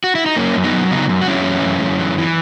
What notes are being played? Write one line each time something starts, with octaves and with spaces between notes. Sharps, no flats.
F#4
E4
D#4
F#2 A#3 C#4
F#2
B3 D#4
F#3
C#3 B3 D#4
F#2
F#4
F#2 C#4 E4
E3
F#2
F#2
E3
E3